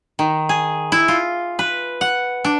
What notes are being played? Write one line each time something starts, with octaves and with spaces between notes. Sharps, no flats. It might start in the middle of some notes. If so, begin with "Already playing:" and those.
D#3
G#4
E4
F4
B4
F#5
D4